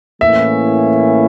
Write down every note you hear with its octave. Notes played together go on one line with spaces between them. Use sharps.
A2 E3 A#3 C#4 E4 E5